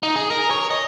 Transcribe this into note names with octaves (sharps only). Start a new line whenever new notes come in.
D#4
G#4
A#4
C#5
D#5